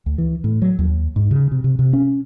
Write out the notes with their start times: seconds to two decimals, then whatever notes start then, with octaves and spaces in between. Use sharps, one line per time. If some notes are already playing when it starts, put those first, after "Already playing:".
0.06 D2
0.18 E3
0.44 A2
0.62 F#3
0.79 D#2
1.16 G#2
1.31 C#3
1.52 C3
1.64 C3
1.79 C3
1.93 C#4